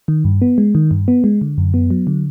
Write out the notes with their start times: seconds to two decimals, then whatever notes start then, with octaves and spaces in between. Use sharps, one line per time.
0.08 D#3
0.25 G2
0.42 B3
0.58 G#3
0.75 D#3
0.91 G2
1.08 B3
1.24 G#3
1.41 D3
1.58 F#2
1.74 B3
1.90 F#3
2.07 D3